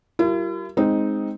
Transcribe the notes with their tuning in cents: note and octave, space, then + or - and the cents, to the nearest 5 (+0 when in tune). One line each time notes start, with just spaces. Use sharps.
G3 -40 E4 +45 A#4 +0
G#3 +5 C4 +0 D#4 +0